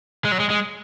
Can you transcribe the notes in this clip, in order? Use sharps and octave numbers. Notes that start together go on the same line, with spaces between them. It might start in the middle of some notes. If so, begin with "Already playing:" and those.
G#3
F#3
G#3
G#3